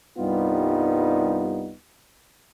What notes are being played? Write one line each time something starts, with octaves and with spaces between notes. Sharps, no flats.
C2 G2 G3 B3 D#4 F4